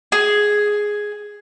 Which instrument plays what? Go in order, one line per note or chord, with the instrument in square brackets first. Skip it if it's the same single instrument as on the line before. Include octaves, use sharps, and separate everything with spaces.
[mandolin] G#4